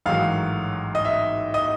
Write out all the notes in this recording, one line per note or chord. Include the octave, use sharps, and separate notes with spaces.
A1 G#2 D#3 F#3 F5
D#5
E5
D#5